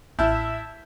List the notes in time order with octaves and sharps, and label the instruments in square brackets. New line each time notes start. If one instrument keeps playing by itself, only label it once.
[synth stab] A1 [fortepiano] E4 [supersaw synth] E5 [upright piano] A5 F6 G6